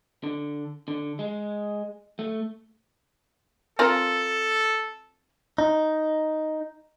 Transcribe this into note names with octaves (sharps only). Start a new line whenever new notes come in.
D3
D3
G#3
A3
C4 F4 A4 A#4
D#4